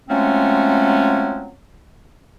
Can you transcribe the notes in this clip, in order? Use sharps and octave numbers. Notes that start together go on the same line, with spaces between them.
F3 F#3 G#3 A3 C4 C#4